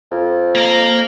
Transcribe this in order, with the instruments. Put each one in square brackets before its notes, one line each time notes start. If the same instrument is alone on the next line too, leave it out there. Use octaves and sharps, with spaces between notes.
[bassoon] F2
[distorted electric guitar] A#3 A#5